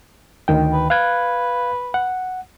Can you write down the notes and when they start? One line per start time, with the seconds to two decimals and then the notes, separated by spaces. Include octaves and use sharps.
0.48 D2 D#3 G5
0.73 B4
0.90 B4 F5 F#6 G#6
1.94 F#5